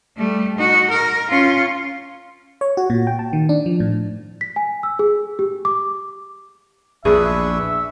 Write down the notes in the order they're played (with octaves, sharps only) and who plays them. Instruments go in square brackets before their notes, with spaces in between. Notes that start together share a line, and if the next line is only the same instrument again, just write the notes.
[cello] G3 A3
D#4 F#4
A#4
C#4 F4
[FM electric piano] C#5
F#4
A#2
G5
A5
D#3
D4
F3
A2
[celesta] B6
G#5
E6
G#4
G4
D6
[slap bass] A#1 E2 [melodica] D4 B4 C#6 [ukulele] G#4 [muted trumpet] E5